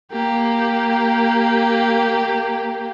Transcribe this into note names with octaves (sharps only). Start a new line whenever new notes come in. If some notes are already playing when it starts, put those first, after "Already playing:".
A#3 G4